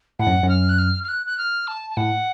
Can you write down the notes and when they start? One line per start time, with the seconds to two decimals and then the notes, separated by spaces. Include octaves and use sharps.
0.19 A2 F#5
0.27 F#2
0.43 F#2
0.49 F6
0.69 F#6
0.78 F6
1.04 F6
1.08 F#6
1.26 F#6
1.38 F6
1.68 A5
1.90 A5
1.97 A2 F#5